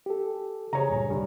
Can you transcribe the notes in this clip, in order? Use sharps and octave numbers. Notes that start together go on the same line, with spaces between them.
G4 A4
C#3 G#4 C#5 A#5
D2 G2 A#2
C2 G2 D3